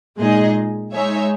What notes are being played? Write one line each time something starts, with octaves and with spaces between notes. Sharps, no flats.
A#2 G#3 D#4 G#4 D#5
G#3 D#4 G#4 C#5 E5